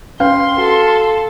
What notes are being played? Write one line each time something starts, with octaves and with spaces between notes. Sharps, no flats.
C#4 B4 F5 G5 C6
F#4 A4